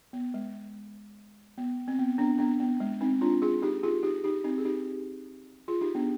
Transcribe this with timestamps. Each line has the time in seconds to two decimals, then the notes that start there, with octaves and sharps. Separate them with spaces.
0.13 B3
0.34 G#3
1.58 B3
1.88 C4
1.99 B3
2.18 B3 D4
2.39 B3 D4
2.60 B3
2.80 G#3
3.01 C4 D#4
3.21 D4 F4
3.42 F4 G#4
3.62 D#4 G4
3.83 F4 G#4
4.03 D#4 G4
4.24 D#4 G4
4.44 C4 D#4
4.58 G#4
4.65 D#4 G4
5.68 F4 G#4
5.81 D#4 G4
5.95 B3 D4